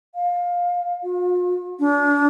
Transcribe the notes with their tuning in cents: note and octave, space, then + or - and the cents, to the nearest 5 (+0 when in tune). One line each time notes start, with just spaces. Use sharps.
F5 +20
F4 +45
D4 -35